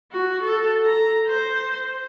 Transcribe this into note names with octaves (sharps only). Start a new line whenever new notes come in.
F#4
A4
A#5
C5